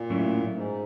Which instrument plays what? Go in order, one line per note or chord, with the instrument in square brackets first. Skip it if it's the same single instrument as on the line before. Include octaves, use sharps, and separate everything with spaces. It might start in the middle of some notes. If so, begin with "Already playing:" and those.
Already playing: [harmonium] A#2
[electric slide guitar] A2 F#3 A3 C#4 E4
[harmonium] G#2